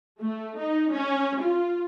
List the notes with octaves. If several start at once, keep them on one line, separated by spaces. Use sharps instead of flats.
A3
D#4
C#4
F4